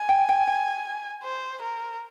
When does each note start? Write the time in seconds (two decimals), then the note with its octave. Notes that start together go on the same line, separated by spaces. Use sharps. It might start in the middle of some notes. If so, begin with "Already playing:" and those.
Already playing: G#5
0.09 G5
0.29 G5
0.47 G5
1.23 C5
1.62 A#4